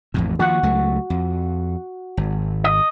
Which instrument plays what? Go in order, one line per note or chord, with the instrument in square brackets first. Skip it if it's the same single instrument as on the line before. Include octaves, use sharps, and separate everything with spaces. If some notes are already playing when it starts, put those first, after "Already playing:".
[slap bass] A1 F2 A2
[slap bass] D#2 F3 [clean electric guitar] F#4 F#5
[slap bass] C#2 F#3 A3
F2
G#1
[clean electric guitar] D#5